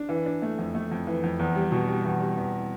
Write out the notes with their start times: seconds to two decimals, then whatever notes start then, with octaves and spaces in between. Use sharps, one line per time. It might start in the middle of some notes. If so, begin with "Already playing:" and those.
Already playing: D4
0.09 E3
0.26 D4
0.42 A3
0.58 F2
0.75 A3
0.91 F2
1.07 E3
1.23 F2
1.39 E2
1.56 G3
1.72 B2
1.88 G3
2.04 E2
2.20 G3
2.37 E2